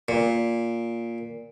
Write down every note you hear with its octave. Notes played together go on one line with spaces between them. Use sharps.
A#2